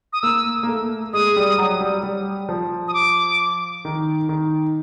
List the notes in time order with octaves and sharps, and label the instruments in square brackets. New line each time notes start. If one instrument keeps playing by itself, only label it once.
[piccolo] D#6
[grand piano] A#3 [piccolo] E6
[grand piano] A#3
A3
[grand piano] G#3 [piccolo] D#6
[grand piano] G3
F#3
G3
G3
F3
[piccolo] D#6
D6
[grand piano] D#3
D#3